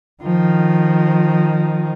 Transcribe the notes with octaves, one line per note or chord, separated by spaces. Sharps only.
D#3 F3